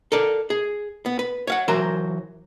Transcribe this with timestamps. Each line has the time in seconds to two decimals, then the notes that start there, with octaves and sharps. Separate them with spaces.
0.12 A4 A#4 D5
0.50 G#4
1.06 B3
1.19 B4
1.47 C#5 F5 F#5
1.68 E3 F#3 A#4 C5